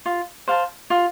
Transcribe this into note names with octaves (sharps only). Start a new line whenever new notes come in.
F4
C5 F5 A5
F4